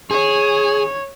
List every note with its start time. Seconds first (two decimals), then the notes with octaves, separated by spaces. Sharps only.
0.11 G#4 C#5